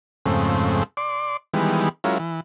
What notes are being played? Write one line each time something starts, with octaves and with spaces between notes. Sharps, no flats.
F2 G#2 C#3 A3 C4
D5 C6 D6
D#3 E3 G3 G#3 B3
F#3 G#3 C#4 E4 F4 A#4
E3